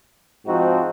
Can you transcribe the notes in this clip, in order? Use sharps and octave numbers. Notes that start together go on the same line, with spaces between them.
G#2 F3 C4 D#4 F#4